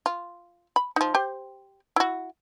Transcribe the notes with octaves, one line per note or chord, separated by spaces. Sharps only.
F4
B5
F3 D#4
G4 C5
E4 F#4